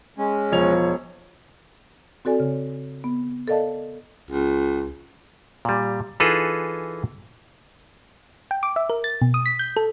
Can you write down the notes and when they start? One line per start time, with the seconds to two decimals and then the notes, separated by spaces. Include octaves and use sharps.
0.18 G#3 C#4
0.52 E1 F3 C#5 F7
2.25 C4 F#4 A4 D5 G#5
2.40 C#3
3.04 B3
3.47 A4 A#4 D5 D#5 F5 A5
4.31 C#2
5.65 A#2 G3
6.20 E3 D#4 F4 G#4 A4 B4
8.51 G5
8.63 D6
8.76 E5
8.90 A#4
9.04 A6
9.22 B2
9.34 D#6
9.46 B6
9.59 G6
9.76 A4